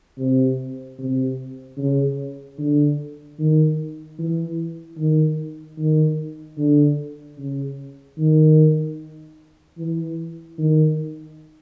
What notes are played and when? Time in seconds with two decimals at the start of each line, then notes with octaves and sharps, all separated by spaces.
0.19 C3
0.99 C3
1.78 C#3
2.59 D3
3.39 D#3
4.19 E3
4.98 D#3
5.78 D#3
6.58 D3
7.38 C#3
8.18 D#3
9.78 E3
10.58 D#3